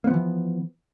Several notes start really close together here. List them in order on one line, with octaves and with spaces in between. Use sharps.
A#3 B3 F3 E3